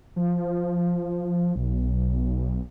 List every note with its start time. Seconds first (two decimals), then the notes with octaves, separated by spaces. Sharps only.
0.16 F3
1.56 B1